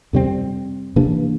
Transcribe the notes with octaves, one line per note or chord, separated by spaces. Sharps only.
F2 C3 G3 C4
C3 E3 A#3 D4